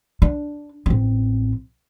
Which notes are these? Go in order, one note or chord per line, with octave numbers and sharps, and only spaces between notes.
D4
A1 C4